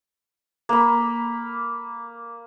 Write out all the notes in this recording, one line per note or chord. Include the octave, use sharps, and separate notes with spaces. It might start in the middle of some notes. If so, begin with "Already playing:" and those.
A#3 B5